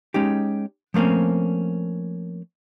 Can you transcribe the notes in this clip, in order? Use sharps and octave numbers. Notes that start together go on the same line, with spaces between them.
G#3 C#4 D#4 G4
F3 A3 A#3 C4 C#4